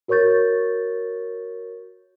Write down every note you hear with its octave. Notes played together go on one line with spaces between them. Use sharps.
F#4 A#4 C#5 C#6 G6 A6